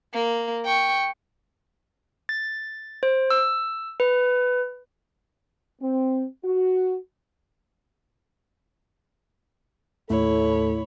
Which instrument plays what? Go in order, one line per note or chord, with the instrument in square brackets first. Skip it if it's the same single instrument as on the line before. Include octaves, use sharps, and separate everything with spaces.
[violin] A#3
G5 C#6
[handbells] A6
C5
E6
B4
[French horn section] C4
F#4
[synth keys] D#2 A2 A3 [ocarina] E4 [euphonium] A4 [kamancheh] C#5 B5